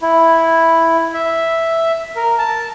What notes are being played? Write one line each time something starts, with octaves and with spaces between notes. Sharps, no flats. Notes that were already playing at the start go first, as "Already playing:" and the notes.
E4
E5
A#4
A5